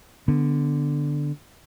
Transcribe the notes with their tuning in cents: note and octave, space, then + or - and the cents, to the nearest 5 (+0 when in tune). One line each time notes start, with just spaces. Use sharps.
D3 +0 B3 +5